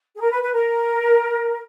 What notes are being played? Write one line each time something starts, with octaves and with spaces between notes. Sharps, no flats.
G#4
A#4
B4
B4
A#4